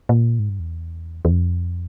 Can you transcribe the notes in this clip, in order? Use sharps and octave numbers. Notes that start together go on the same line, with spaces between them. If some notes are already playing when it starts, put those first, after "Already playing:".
A#2
G#2
G2
E2
E2
F2